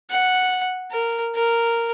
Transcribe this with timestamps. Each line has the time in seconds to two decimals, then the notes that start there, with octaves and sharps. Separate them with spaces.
0.10 F#5
0.91 A#4
1.35 A#4